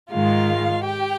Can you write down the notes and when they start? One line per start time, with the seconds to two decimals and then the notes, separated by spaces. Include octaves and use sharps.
0.11 G#2 D#3 G#3 F4 F5
0.85 G4 G5